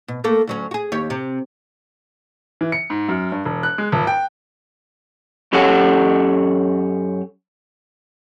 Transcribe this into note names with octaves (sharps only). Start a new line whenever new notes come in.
B2
A3 A#3 A4
D2 F#3 C#4
F#4 G#4
D#2 G4 C#5
C3
E3
C#7
G#2
F#2
G2
E1
F#6
G#3
D#1
G5
F#2 C#4 G4 A4 C#5 F#5